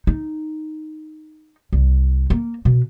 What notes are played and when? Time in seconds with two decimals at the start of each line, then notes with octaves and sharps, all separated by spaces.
0.07 D#4
1.73 C2
2.30 A#3
2.65 B2